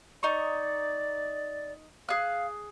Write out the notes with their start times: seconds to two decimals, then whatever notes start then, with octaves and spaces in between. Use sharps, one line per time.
0.23 D#4 D5 A#5 C#6
2.09 G#4 F5 F#6